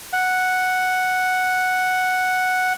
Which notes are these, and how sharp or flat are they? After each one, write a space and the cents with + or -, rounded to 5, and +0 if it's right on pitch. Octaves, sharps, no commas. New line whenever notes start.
F#5 +0